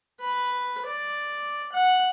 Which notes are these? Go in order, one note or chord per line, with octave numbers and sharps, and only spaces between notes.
B4
D5
F#5